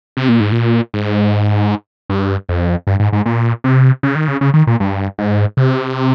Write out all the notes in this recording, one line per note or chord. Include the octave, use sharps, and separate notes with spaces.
C3
A#2
G#2
A#2
G#2
G2
F2
G2
G#2
G#2
A#2
C3
C#3
D#3
C#3
C#3
D#3
A#2
G2
G#2
C3